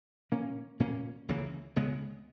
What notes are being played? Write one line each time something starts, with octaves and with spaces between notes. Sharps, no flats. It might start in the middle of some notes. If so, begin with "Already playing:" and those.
A#2 A#3 C#4
A#2 A#3 C#4
C#2 C#3 E3 A#3
C#2 C#3 G#3 B3